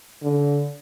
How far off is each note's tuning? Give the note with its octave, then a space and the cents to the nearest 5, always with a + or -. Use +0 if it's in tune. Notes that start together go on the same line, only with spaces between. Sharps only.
D3 -30